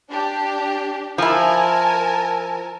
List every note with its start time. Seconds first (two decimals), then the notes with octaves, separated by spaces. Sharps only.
0.11 D4 G4
1.18 F3 E4 A#4 G#5 A5